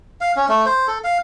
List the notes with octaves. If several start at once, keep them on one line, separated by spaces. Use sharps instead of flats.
F5
C#4
A3
C5
A4
F5